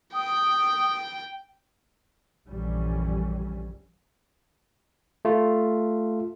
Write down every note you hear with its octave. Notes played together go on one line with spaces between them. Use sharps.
G5 D#6
A#1 F#2 D3 E3 G3 C#4
A3 F4